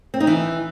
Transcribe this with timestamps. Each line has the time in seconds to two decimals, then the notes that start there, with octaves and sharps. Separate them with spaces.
0.14 C4
0.20 D#4
0.27 E3